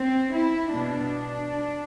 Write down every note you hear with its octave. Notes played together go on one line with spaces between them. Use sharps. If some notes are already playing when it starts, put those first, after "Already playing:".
Already playing: C4
E4
B2 D4